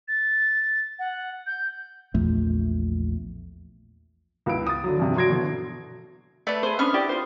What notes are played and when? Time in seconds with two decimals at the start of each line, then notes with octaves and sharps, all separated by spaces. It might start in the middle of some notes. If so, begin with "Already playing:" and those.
0.08 A6
0.99 F#5
1.46 G6
2.14 A#1 E2 A3
4.46 C#2 B3 E4 D7
4.67 D#6 A6
4.84 D3 F#3
4.97 E2 G2 C3
5.16 F#3 D4 C6 G#6 A#6 D7
5.29 B2 D3 E3 F#3
6.47 A3 B4 D5
6.63 G#4 C5
6.79 B3 C#4 D4 C#6 F6
6.94 E4 G4 D5
7.09 F4 C5